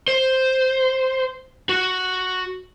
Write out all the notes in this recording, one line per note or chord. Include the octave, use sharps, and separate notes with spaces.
C5
F#4